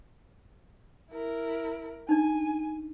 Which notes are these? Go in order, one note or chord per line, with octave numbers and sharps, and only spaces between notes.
E4 A#4
D4 D#4 G#5